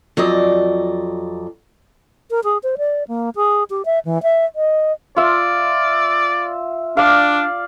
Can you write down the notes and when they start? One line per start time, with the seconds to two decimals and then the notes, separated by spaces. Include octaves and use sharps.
0.17 F2 F#3 D5 D#5
2.31 A#4
2.44 G#4
2.63 C5
2.78 D5
3.08 A#3
3.36 G#4
3.70 G4
3.85 E5
4.05 E3
4.23 E5
4.56 D#5
5.16 F4 D5 E5
6.97 D4 D5 F5